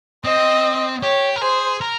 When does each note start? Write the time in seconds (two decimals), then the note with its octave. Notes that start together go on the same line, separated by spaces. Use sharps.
0.25 C4 D#5
1.02 G4 C#5
1.36 A#4
1.41 G#4 C5
1.81 A#4